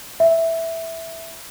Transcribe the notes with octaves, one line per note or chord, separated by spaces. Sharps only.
E5